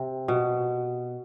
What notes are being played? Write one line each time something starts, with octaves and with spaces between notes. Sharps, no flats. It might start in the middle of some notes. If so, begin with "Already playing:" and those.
Already playing: C3
B2